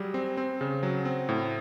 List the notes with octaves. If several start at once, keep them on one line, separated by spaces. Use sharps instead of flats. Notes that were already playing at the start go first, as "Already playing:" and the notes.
Already playing: F#3 G3 G#4
C4
C4
C#3
F#3
C4
A2